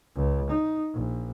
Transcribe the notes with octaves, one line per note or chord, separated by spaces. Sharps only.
C#2
D#4
A#1